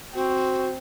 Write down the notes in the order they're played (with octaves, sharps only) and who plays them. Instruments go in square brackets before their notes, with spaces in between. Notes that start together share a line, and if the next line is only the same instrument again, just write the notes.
[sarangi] C4 [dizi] F#4